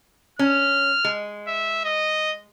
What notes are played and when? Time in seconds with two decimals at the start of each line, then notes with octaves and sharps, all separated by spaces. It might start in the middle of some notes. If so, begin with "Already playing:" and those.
0.39 C#4 F6
1.05 G#3
1.47 E5
1.85 D#5